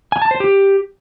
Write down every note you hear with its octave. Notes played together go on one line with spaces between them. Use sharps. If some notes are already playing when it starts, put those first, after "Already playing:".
G#5
A5
C5
G4